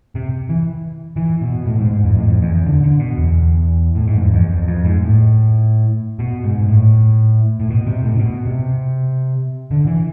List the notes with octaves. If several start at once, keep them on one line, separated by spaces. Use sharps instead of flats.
C3
E3
E3
B2
A2
G#2
G#2
F2
A2
F2
E2
E2
D3
D3
B2
E2
A2
G#2
F2
E2
F2
F2
G#2
A2
B2
G#2
A2
A2
B2
C3
A2
C3
B2
C3
D3
E3